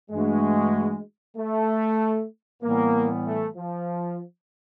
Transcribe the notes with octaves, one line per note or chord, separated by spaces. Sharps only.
G2 E3 G#3 A3 D4 F#4
A3
A2 E3 G3 A#3 B3
A3
F3